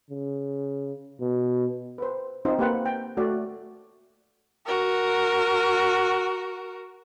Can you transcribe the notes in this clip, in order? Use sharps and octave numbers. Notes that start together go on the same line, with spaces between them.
C#3
B2
B4 C5
C4 D#4 F4 C5
A#3 G4 B4 C5 F#5 G5
G5
A3 F#4 D5
F#4 A#4